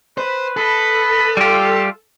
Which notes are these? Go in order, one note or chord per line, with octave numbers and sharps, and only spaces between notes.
B4 C5
A4 B4 D#5 B5
G3 A3 F4 G4